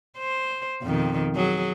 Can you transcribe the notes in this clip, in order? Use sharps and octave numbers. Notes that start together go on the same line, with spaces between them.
C5
F2 B2 D#3
F#3 G#4